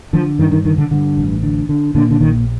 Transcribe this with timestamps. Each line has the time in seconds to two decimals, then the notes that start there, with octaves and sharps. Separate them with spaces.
0.13 D3 F3
0.39 G2 D#3
0.52 D#3
0.65 D3 D#3
0.78 D3
0.91 G2 D3
1.17 A1
1.43 D3
1.69 D3
1.95 A#2 D3
2.11 D3
2.21 A#1 D#3